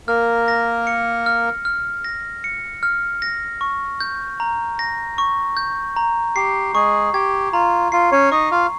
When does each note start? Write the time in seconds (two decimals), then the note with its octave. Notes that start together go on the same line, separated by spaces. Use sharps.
0.08 A#3 A#4 F6
0.48 A#6
0.87 C#7
1.26 F6
1.65 F6
2.04 A#6
2.44 C#7
2.83 F6
3.22 A#6
3.61 C#6
4.00 G6
4.40 A#5
4.79 A#6
5.18 C#6
5.57 G6
5.96 A#5
6.36 G4 C7
6.74 G#3 G#4 C#6
7.14 G4 G#6
7.53 F4 A#5
7.92 F4 C7
8.12 C#4 C#5
8.32 D#4 D#5 C#6
8.51 F4 F5